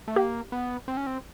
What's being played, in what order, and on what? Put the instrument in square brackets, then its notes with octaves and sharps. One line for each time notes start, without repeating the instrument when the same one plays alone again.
[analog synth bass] A3
[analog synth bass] A#3 [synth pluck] G4
[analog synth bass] B3
C4
C#4
C4